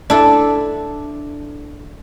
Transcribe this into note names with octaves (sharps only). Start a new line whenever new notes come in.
D4 E4 A4